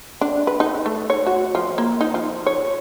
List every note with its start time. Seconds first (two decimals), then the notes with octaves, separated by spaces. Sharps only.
0.21 D4
0.47 B4
0.60 D#4
0.86 A3
1.10 C#5
1.26 F#4
1.55 F3
1.78 A#3
2.01 D#4
2.14 F3
2.47 C#5